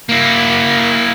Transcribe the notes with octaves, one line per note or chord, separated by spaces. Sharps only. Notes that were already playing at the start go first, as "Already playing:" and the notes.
A#3 E4